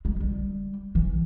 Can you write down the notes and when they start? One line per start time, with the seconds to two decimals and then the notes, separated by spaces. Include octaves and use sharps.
0.05 G#3
0.20 G3
0.95 E3